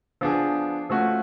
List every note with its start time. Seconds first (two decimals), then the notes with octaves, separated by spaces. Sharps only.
0.21 F3 B3 D4 G#4
0.90 F3 A3 C#4 F#4